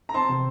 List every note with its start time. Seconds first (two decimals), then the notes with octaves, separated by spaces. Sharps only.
0.09 A#5
0.14 C4 A5 C6
0.29 C3